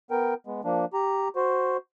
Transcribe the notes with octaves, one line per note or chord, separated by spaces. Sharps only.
B3 A#4 G5
G#3 B3
F3 A#3 D4
G4 A#5
F#4 C5